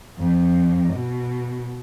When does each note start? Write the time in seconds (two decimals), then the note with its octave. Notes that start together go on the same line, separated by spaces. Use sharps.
0.18 F2
0.93 B2